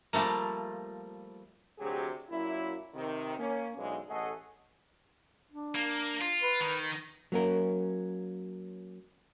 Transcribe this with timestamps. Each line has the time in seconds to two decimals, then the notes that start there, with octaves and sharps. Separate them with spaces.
0.13 F3 G3 A3 A#3
1.78 D2 C3 F#3 G4 G#4
2.29 F#2 A#2 F#3 E4
2.95 C3 D#3
3.38 A#3 C#4
3.77 B1 E2 C3 G#3 D4 F5
4.08 A1 A3 G#4 A4 D#5 F#5
5.52 D4
5.75 A#3
6.21 F4
6.42 B4
6.60 D#3
7.32 F#3 A#3 C#4 A#4